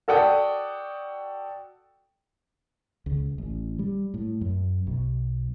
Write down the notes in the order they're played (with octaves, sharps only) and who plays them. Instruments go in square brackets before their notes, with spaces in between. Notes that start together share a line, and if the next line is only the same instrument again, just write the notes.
[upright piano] F#4 A4 D5 F#5 G5 D#6
[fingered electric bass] C#2
A1
G3
A2
F#2
B1